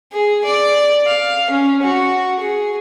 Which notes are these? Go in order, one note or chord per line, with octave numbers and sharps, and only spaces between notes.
G#4
D5
F5
C#4
F#4
G#4